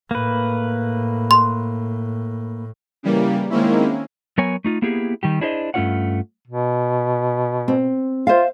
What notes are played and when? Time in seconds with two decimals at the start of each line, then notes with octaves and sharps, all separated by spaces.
0.11 A2 A#3 B4
1.31 C6
3.03 C#3 E3 G3 A#3
3.50 D#3 G#3 A#3 C4 C#4 E4
4.38 F#3 B3 A#4 C#5 G#5
4.65 A3 D#4 F4
4.82 A#3 B3 E4 G4 G#4
5.23 D#3 G3 G4
5.41 D4 E4 G#4 C5 D5 D#5
5.74 G2 A3 C#4 F4 C#5 F#5
6.48 B2
7.68 C4
8.27 F4 C5 E5 F5